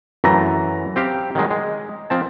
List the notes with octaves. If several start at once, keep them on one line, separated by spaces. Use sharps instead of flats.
F#2 E3 A3 A#5 A#6
C4 G4 F5
D#3 F#3 G#3
G#3
F3 C4 A5